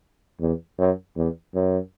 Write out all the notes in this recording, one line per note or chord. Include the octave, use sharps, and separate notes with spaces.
E2
F#2
E2
F#2